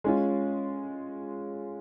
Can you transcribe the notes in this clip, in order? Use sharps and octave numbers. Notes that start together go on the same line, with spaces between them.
G#3 C#4 F4